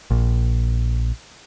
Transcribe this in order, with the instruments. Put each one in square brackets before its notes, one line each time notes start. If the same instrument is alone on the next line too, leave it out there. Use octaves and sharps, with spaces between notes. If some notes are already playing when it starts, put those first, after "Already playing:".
[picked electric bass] A#1